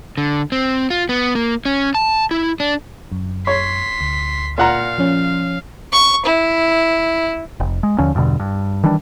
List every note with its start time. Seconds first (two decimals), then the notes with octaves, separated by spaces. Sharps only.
0.18 D3
0.52 C4
0.90 F4
1.09 B3
1.35 A#3
1.65 C#4
1.95 A5
2.31 E4
2.60 D4
3.12 F#2
3.47 C#5 C6 B6
4.01 D2
4.58 A#2 F5 F#5 A#5
4.98 F3 C#4
5.92 C#6
6.25 E4
7.60 F1
7.83 G#3
7.98 D#2 D3 F3 C#4
8.15 E2 G2 B2 D3
8.40 G2
8.84 D#3 E3 G3 D4